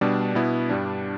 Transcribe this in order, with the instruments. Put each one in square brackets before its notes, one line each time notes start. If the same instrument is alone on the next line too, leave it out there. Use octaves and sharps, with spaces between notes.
[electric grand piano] B2 G3 D4
B2 B3 E4
G2 G3 D4